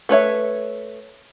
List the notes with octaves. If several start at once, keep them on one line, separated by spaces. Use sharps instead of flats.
A3 B4 C#5 E5